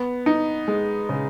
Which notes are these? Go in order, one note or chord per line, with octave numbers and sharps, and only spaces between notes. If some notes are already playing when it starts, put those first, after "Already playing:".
Already playing: B3
D#4
G#3
C#3